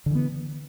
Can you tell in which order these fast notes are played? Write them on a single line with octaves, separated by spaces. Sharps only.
D3 E3 B3